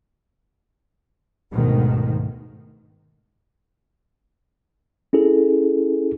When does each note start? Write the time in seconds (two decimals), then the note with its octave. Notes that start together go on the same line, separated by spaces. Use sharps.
1.52 D2 G#2 B2 D#3
5.13 C#4 E4 G#4 A4